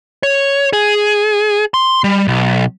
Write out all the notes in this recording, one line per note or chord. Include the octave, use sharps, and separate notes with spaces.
C#5
G#4
C6
G3
B1